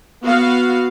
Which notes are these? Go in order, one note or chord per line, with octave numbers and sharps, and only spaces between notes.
B3 F#4 F5